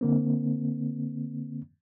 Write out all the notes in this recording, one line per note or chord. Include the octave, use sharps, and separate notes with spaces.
D3 A#3 C4